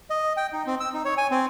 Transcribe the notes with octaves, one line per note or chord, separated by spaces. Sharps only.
D#5
G5
D#4
C4
E6
D#4
C#5
G#5
C4